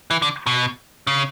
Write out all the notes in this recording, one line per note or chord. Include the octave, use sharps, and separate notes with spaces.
E3
D3
B2
C#3